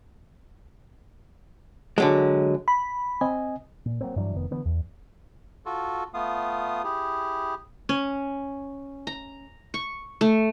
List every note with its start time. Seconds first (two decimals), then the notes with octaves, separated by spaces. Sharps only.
1.98 D3 F#3 G#3
2.68 B5
3.21 C4 D#5 G#5
3.86 A#2
4.01 F#3 A#3 C4
4.16 G2 E3 F#3 D4
4.34 F1 D#3 B3
4.51 D3 E3 B3
4.65 E2
5.66 F4 F#4 A4
6.14 A3 B3 F4 F5 D#6
6.84 E4 G4 G#4
7.89 C#4
9.07 A#5
9.74 C#6
10.21 A3